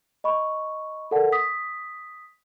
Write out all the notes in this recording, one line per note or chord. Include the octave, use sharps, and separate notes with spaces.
D#5 B5 C#6
A4 A#4 D5 F#5 A5
D#6 B6